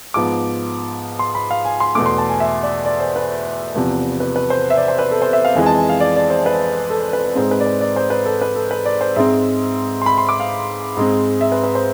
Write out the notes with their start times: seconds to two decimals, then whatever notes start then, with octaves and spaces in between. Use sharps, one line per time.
0.14 G#2 F3 B3 D6
1.19 C6
1.35 B5
1.51 F5
1.65 G#5
1.80 C6
1.95 E2 B2 A3 D6
2.06 C6
2.18 A5
2.29 G#5
2.40 E5
2.63 D5
2.86 D5
3.00 C5
3.16 B4
3.75 E2 C3 F3
4.20 B4
4.36 B4
4.50 C5
4.70 E5
4.77 D5
4.88 C5
4.99 B4
5.11 A4
5.22 C5
5.33 E5
5.45 F5
5.55 F2 E3 G#3 G#5
5.66 A5
5.77 G#5
5.89 F5
6.00 D5
6.16 D5
6.30 C5
6.46 B4
6.90 A4
7.13 B4
7.35 G#2 G#3 C4 C5
7.51 B4
7.60 D5
7.66 C5
7.81 D5
7.96 C5
8.10 B4
8.25 A4
8.41 B4
8.56 A4
8.71 B4
8.85 D5
9.01 C5
9.16 G#2 G#3 C4 E5
10.02 C6
10.06 B5
10.18 C6
10.29 D6
10.40 F5
10.97 G#2 G#3 C4
11.41 E5
11.52 B4
11.63 B4
11.75 C5